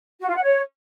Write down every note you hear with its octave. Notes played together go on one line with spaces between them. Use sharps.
F#4
F4
F#5
C#5